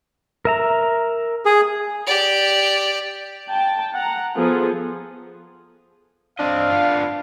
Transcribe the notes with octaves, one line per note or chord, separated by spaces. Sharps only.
A#4 E5 A#5
G#4
G4 D5
G5 A5
F#5 A#5
F3 B3 F4 G#4 A4
C4 D4 D#5 F5
B3 F4